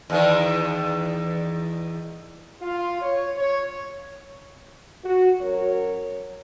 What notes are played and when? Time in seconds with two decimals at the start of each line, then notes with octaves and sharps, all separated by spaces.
0.10 E2 D#3
2.62 F4
3.01 C#5
3.36 C#5
5.04 F#4
5.41 F#3 C#4 A#4 C#5